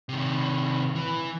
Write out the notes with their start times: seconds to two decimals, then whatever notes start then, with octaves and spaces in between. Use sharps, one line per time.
0.09 C3 D#3
0.95 E3